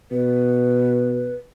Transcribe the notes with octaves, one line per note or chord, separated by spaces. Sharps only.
B2 B4